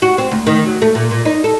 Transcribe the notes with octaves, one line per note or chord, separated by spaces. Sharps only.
F#4
C4
D2
D#3
F#3
A3
A#2
A#2
D#4
A4